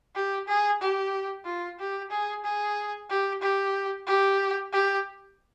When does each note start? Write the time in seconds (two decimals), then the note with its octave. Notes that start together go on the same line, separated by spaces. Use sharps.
0.15 G4
0.48 G#4
0.81 G4
1.45 F4
1.79 G4
2.11 G#4
2.44 G#4
3.10 G4
3.41 G4
4.07 G4
4.73 G4